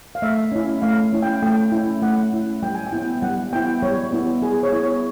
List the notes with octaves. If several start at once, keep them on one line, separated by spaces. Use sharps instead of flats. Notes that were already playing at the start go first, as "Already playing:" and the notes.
F5
A3 E5
C#4 E4
A3 F5
C#4 E4
G5
A3 G5
C#4 E4
A3 F#5
C#4 E4
G3 G5
G#5
G5
B3 E4
G3 F#5
B3 E4 G5
G3 C#5
B3 E4
G3 G#4
C#5
B3 E4
C#5